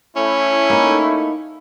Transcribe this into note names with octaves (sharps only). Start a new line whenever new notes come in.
A3 C#4 E4
A#3 D#4